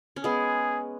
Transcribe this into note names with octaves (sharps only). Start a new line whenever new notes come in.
C#4
G#3 B3 G#4